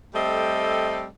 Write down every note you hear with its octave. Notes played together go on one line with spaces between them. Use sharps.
G3 A3 C4 A4 D#5